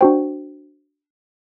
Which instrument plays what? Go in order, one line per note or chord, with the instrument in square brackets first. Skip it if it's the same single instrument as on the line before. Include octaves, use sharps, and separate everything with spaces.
[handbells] D4 F#4 C5 G5